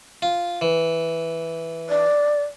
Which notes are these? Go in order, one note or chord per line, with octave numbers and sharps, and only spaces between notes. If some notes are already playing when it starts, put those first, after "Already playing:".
F4
E3
D5